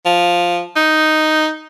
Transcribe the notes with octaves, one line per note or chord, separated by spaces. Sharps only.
F3
D#4